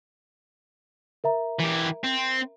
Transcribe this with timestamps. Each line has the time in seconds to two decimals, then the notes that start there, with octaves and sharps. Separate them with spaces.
1.24 A#4 E5 A#5
1.60 E3 G4
2.04 C4